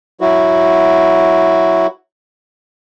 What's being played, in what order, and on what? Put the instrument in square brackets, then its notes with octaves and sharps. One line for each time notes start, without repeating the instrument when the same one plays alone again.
[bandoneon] F#3 E4 F#4